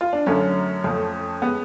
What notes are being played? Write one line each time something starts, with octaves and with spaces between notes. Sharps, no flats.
F4
D4
F#2 D3 F#3 A3 C#4
F2 F3 A3
G#3 B3